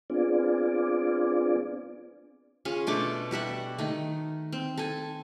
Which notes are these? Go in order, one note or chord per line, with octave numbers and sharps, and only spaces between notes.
B3 C4 D4 F4 G#4 D5
C#4 F4 G#4
B2 A3 D4 D6
G3 F#4 E5 F#5
D#3 A3
C4
A4 G#5